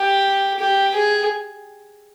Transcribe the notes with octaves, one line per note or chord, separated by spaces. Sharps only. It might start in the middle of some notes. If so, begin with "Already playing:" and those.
Already playing: G4
G4
G#4